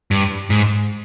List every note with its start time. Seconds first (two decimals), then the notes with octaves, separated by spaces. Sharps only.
0.11 G2
0.50 G#2